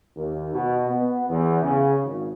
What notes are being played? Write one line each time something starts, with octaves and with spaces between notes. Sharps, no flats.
D#2
B2
B3
E2
C#3
G#1